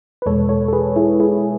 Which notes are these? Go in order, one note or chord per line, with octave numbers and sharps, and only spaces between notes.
B4
E2 B2 G#3 A4 C#5
A4 C#5
A4
G#4 B4
E4 G#4
E4 G#4